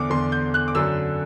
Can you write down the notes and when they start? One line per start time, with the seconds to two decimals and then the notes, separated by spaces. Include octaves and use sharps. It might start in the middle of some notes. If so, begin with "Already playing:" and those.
Already playing: E2 D3 D6
0.10 E2 D3 C6
0.32 G6
0.54 F#6
0.68 D6
0.75 F#2 D3 E6